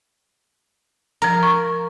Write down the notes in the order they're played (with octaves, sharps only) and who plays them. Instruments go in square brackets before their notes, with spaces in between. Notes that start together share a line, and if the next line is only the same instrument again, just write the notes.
[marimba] F3 A#5 [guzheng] A#4
[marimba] C#6